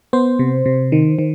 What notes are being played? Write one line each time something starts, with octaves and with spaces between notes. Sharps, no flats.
B3 C5
C3
C3
D#3
D#3